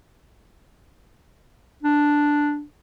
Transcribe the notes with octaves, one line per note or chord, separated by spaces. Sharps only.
D4